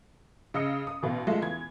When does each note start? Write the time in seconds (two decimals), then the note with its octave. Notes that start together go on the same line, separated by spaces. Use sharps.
0.54 C#3 D#5 E6 C#7
0.87 D#6
1.02 A1 B2 F5
1.27 F#3 G#3 A3 F4
1.42 E2 G#6